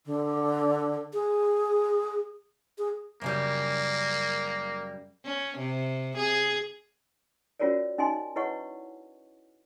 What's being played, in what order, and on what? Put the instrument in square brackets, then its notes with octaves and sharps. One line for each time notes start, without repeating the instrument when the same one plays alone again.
[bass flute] D3
G#4
G#4
[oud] F#2 C#3 G3 [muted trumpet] A#3
[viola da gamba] C#4
C3
G#4
[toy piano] C#4 F4 F#4 A#4 C#5 D5
C#4 D#4 D#5 G#5 C6
E4 B4 C#5 D#5 F#5 C#6